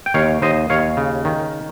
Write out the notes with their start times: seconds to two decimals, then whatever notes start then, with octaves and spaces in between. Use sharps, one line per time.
0.06 G5
0.14 D#2 C#5 F5
0.42 D#2 C5 D#5
0.70 D#2 C#5 F5
0.97 C#3
1.25 D#3